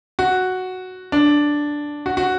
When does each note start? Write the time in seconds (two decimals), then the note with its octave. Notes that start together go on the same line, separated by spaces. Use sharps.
0.19 F#4
1.12 D4
2.06 F#4
2.17 F#4